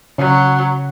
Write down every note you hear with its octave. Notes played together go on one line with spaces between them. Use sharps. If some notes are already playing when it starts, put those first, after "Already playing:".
C#3 F#3